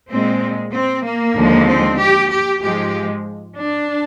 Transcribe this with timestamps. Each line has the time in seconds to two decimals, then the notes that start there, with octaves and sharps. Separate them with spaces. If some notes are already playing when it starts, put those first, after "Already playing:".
0.10 A#2 G#3 C4
0.74 C4
1.05 A#3
1.37 D#2 D3 F3 G#3
1.68 C4
1.99 G4
2.31 G4
2.63 G#2 F3 G#3 G4
3.58 D4